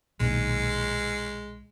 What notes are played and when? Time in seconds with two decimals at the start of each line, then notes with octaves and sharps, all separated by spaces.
0.20 B1 A#2 D#3 G#3